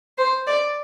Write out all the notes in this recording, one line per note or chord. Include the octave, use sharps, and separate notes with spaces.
C5
D5